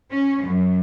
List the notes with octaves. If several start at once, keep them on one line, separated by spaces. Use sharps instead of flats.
C#4
F#2